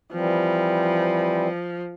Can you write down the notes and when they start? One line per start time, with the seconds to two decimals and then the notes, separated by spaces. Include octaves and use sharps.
0.12 E3 F3 G3 C4